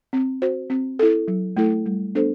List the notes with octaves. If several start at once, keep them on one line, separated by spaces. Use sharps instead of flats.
C4
F#4 C5
C4
E4 A4
F#3
A3 E4 A4
G3
B3 D4 A4 C5